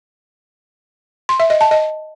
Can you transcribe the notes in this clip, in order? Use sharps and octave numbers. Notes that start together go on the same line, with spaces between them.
C6
E5
D#5
A5
D#5